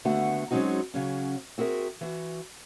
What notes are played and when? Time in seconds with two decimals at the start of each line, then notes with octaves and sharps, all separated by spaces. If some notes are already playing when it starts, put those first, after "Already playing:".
0.05 D#2 D3 A3 B3 F#4 F#5
0.51 F#3 G#3 C4 C#4 D#4 F#4
0.94 C#3 F#3 C#4
1.58 C4 F#4 G#4 A#4 E5
2.01 E3 F#4